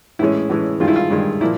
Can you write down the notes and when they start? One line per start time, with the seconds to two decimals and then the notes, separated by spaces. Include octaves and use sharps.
0.19 A2 E3 G#3 C#4 E4
0.50 A2 E3 G#3 C#4
0.80 G2 D#3 G#3 F4
0.88 E4
0.96 F4
1.11 G2 D#3 G#3
1.41 A#2 F3 A#3 E4